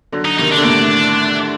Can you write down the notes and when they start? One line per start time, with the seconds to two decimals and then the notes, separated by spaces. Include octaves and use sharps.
0.12 D3 F#3
0.25 D#4
0.39 C3 D#3 D#4
0.52 D4
0.57 D3
0.64 A2 C3 D4